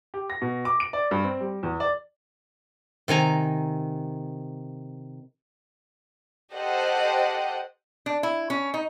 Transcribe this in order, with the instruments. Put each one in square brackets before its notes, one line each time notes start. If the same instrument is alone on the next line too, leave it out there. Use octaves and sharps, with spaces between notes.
[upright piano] G4
A#6
B2
D6
D7
D5
G2
C4
G3
E2
D5
[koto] C3 D#3 G#5 A#5
[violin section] G4 A4 C5 D#5 F#5
[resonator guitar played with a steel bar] D4
E4
C#4
D#4